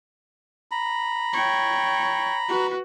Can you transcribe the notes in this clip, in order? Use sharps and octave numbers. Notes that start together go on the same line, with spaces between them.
A#5 B5
C#5 G5
F#4 B4